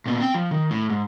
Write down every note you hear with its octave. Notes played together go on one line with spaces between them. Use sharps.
A#2 B3
C4 G5
F3
D#3
A2
G#2